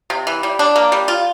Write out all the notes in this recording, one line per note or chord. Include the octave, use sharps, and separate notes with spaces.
C3
E3
G3
D4
A#3
G3
F4